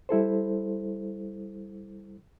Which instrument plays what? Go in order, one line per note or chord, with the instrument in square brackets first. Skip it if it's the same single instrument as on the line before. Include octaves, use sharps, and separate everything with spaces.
[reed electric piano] G3 E4 A4 C5